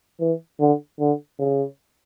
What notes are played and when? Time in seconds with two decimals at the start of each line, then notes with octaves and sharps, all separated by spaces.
0.20 E3
0.60 D3
1.00 D3
1.39 C#3